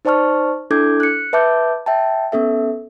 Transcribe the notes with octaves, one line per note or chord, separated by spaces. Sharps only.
D#4 C5 D5 A5 C#6 F6
D4 E4 A4 D6 G6 G#6
F#6 C#7
B4 E5 A5 D6 G6
E5 G5 A5
B3 C#4 A4 E5